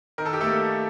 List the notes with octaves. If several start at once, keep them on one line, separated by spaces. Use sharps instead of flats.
D#3 A#4
A4
G4
A3 A4
A#3